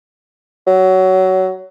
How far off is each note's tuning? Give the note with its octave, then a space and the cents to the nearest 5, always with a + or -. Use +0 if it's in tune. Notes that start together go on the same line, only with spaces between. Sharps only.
F#3 +20